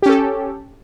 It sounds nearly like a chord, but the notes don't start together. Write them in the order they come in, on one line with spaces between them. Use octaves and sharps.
G4 C#4 A4